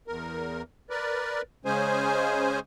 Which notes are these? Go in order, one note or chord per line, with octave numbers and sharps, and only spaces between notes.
E2 A#4
A#4 B4 D5
C#3 G#3 C#4 G#4 C5 G#5